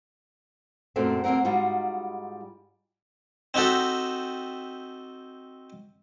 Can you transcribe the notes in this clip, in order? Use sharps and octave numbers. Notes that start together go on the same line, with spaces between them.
F#2 A#2 F#3 A3 C4
D2 A#3 C4 A#4 F#5
G#2 G3 D#4 F4 F#4
C4 D#4 F#4 G4 A4